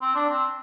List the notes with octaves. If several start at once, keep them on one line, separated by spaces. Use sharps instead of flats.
C4
D4
C4